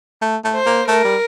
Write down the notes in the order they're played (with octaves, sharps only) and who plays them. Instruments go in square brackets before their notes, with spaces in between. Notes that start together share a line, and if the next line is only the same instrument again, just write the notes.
[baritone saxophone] A3
A3
[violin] C5
[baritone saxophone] A#3
[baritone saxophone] A3 [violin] A#4
[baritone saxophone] G3